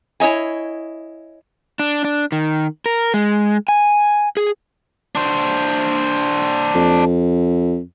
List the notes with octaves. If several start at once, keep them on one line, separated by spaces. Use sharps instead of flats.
E4 C#5 D#5 G#5
D4
D4
D#3
A#4
G#3
G#5
G#4
D4 C5
F2